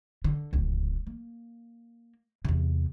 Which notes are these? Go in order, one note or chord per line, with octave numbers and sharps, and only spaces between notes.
D3
D1 C#2
A#3
E2 C3